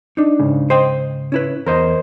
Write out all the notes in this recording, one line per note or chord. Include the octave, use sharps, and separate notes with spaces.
D4 D#4
G#2 C#3
C5 D#5 G5
C#4 E4 B4
E2 A#4 C5 D#5